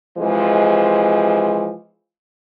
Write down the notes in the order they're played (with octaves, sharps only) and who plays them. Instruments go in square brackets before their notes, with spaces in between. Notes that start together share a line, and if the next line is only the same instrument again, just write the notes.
[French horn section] C3 E3 F3 G#3